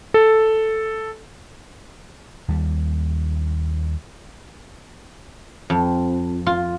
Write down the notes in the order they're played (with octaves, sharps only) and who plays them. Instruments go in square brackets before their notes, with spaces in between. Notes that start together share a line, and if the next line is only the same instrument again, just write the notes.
[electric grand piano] A4
[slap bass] D#2 G3
[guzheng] F2
F4